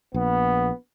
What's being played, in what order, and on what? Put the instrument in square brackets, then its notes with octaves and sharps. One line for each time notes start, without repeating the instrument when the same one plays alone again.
[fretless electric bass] A#1 [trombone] B3